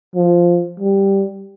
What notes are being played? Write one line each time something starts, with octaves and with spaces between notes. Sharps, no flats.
F3
G3